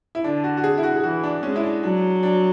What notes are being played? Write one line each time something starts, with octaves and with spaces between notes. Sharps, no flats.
E4
D3 D4
F#4
F#4
G#4
E4
F#4
G#4
E3 F#4
D4
G#3 C#4
E4
D4
F#3 D4
D4